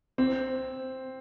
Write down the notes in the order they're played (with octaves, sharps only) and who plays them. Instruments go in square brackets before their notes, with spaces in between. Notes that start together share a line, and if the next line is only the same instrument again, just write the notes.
[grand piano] C4